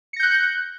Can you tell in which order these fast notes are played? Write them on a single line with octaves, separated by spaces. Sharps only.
C#7 A#6 G6 F#6